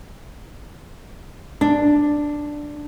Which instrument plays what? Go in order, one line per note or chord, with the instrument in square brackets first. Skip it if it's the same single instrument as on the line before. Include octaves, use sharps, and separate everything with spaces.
[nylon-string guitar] D4